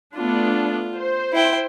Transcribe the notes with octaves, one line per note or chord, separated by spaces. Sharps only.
A3 B3 D4 F4
C5
E4 G5